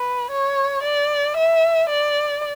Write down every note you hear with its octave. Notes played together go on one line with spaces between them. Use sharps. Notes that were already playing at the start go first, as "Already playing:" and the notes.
Already playing: B4
C#5
D5
E5
D5